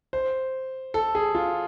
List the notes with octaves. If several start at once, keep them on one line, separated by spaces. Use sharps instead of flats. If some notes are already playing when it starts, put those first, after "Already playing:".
C5
A4
G#4
F4